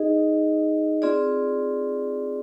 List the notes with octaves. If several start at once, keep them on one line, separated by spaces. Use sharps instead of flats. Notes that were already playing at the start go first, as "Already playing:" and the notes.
Already playing: D#4 G#4 D#5
C4 F4 G#4 D5